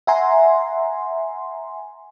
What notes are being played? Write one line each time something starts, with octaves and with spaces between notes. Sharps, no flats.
E5 F#5 G#5 A#5 C6